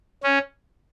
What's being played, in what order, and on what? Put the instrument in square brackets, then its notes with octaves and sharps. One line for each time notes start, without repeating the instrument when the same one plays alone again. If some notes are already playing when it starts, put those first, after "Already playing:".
[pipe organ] C#4